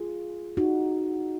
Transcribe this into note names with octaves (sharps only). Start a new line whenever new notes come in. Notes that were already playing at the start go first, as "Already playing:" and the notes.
Already playing: F4 G#4
D#4 F#4